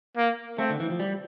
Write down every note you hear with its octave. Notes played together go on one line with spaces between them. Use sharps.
A#3
A3 C4
D3
E3
F3
G3